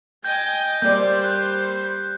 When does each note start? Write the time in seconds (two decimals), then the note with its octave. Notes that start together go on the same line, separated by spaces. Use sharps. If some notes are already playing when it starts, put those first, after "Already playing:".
0.24 D#5 G5 G#5 G6
0.82 G3 A#3 C5 D5 G6
1.24 F#6